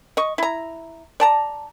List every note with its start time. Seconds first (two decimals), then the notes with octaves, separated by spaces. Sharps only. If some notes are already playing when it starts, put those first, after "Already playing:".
0.17 D#5 C#6
0.38 E4 A#5
1.20 D5 A5 A#5